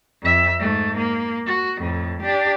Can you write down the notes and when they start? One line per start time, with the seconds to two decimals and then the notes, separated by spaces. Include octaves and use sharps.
0.22 F2 E5
0.60 G#2 A3
0.97 A#3
1.46 F#4
1.78 F2 A2
2.22 D4 G4